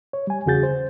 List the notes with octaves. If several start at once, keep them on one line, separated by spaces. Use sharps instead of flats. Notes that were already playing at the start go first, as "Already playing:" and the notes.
C#5
G3 G#5
E2 C#3 F#4 G#4 G6 A6
C5